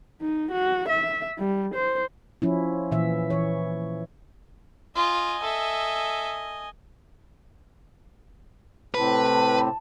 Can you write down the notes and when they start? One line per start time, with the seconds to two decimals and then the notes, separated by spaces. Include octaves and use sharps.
0.22 D#4
0.52 F#4
0.89 E5
1.38 G3
1.74 C5
2.42 F3 C#4 E4
2.91 A#2 E3 E5
3.30 E3 C#5
4.96 F4 D#5 G#5
5.43 A4 E5
8.94 A2 C3 B4 A5